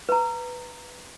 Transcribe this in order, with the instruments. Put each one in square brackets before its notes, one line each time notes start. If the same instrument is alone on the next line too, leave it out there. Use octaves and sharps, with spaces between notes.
[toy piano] B4 A#5